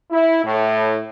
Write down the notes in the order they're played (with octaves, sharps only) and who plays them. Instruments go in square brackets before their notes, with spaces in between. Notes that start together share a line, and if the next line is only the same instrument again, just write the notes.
[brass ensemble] E4
A2